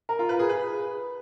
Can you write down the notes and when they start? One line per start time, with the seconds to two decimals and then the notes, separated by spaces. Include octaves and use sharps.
0.09 A#4
0.19 F4
0.29 B4
0.39 G#4
0.49 B4